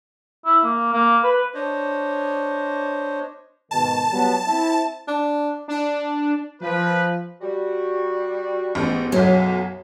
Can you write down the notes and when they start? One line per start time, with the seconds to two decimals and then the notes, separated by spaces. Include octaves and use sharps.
0.45 E4
0.64 A#3
0.93 A#3
1.24 B4
1.54 D4 C5 C#5 D#5
3.71 G#2 B2 D#3 A5
4.12 F#3 G3 B3
4.47 C4 E4
5.07 D4
5.68 D4
6.61 F3 B4
7.41 G3 F#4
8.75 A1 G#2 B3
9.12 B1 F#2 F#3